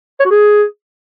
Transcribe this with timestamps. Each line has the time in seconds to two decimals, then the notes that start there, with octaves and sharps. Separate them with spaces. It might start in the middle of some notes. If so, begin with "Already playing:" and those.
0.20 C#5
0.25 F#4
0.31 G#4